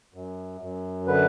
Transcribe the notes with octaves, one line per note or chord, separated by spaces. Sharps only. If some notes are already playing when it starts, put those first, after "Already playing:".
F#2
F#2
D3 B4